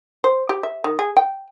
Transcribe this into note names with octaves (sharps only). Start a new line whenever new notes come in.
C5
G4
E5
D#3
G#4
G5